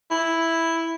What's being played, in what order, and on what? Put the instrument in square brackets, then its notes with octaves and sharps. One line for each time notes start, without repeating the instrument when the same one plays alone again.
[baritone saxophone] E4